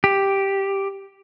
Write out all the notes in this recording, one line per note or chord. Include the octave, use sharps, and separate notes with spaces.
G4